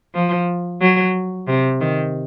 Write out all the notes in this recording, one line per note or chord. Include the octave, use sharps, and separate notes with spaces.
F3
F#3
C3
D#3